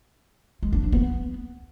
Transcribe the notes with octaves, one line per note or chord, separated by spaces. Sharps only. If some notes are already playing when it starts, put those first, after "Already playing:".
G#3
D4
F3
B3